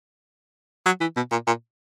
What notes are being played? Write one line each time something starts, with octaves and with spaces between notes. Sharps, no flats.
F#3
E3
B2
A#2
A#2